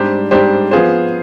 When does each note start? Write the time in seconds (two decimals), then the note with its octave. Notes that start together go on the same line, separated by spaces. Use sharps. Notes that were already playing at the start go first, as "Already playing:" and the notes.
Already playing: G#2 G3 D4 G4 C5
0.31 G#2 G3 D4 G4 C5
0.71 F3 B3 F4 G#4 C5